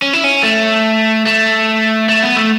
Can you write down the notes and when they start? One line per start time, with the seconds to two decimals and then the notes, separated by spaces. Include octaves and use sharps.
0.02 C#4
0.13 E4
0.24 C#4
0.43 A3
1.26 A3
2.09 A3
2.23 B3
2.37 A3